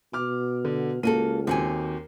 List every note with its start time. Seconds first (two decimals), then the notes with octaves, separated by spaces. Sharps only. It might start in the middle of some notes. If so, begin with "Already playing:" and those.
0.14 B2 D6 F6
0.65 D3
1.03 C#2 A#3 F#4 A4 D#7
1.47 D#2 C4 F#4 G#5